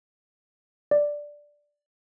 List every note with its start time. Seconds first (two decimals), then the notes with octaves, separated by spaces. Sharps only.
0.91 D5